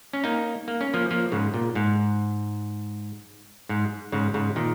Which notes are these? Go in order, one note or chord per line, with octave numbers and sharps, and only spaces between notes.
C#4
A#3 D#4
A#3
C#4
F3 A#3
F3 A#3
G#2 C#3
A#2
G#2
G#2
G#2 C#3
G#2 C#3
A#2 D#3